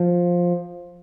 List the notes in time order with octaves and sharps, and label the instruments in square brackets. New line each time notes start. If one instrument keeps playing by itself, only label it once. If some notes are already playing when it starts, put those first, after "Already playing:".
Already playing: [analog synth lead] F3